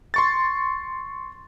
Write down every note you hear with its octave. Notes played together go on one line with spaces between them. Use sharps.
C6 C#6 A6